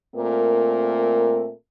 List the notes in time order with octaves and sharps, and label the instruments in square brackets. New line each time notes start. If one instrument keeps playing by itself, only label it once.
[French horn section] A#2 A3 C4 A#4